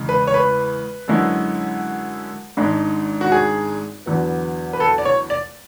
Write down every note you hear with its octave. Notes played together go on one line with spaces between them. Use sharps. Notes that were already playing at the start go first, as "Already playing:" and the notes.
Already playing: E2 C#3 G#3
B4
C#5
B4
F#2 D3 G#3 C#4 E4
G#1 G#2 G#3 D4
F#4
G#4
E2 D3 F#3 B3
B4
A4
D5
C#5
D5